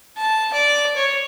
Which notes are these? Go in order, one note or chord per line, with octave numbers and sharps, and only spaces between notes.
A5
D5
C#5